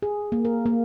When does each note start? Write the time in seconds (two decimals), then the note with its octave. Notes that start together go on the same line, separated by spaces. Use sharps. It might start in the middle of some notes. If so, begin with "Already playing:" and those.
0.02 G#4
0.32 A#3
0.45 A#4
0.66 A#3